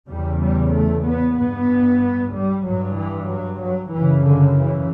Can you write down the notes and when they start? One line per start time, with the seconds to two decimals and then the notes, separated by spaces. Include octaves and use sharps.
0.08 E2 C#3 G3
0.41 G3
0.72 A3
1.05 B3
1.36 G2 B3
2.32 G3
2.65 G2 F#3
2.97 E3
3.29 F#3
3.61 F#3
3.93 F#2 C#3 E3
4.25 D3
4.58 E3